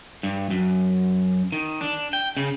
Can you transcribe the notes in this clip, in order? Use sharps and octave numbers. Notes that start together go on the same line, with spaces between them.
G2
F#2
D#3
D4
G5
C#3